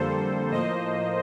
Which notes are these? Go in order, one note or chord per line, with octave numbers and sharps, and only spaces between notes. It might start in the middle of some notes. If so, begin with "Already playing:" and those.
Already playing: F2 D3 G3 A#3 A4 C5
A2 F3 A#3 C5 D#5